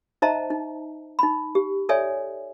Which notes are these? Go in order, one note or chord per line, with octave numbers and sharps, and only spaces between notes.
D#4 C5 D#5 E5 A5 A#5
D#4
D#4 B5
G4
A4 C#5 D5 E5 G#5